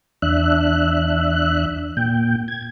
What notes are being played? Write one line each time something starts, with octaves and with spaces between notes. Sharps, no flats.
E2 D4 E5 F#6
A#2 G5
G#6